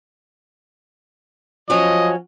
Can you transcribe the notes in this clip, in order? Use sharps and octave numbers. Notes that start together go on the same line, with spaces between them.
F3 F#3 C#4 D#5